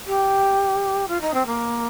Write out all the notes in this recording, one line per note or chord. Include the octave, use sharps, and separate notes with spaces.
G4
F4
D#4
C4
A#3